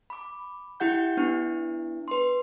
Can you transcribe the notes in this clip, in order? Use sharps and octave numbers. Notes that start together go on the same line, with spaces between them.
B5 D6
E4 G4 F#5 G6
B3 D4 E4
B4 C6